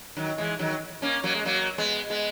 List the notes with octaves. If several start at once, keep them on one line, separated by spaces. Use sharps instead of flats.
D#3 F#3
E3 G#3
D#3 F#3
A#3 C#4
F#3 A#3
G#3
F#3 A#3
G#3 B3
G#3 B3